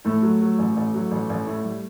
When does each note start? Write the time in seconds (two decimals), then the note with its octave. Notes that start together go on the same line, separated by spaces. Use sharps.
0.05 A2 A3
0.22 F#3
0.41 F#3
0.58 A1
0.76 A1
0.94 F#3
1.11 A1
1.30 A1
1.47 A2
1.64 G3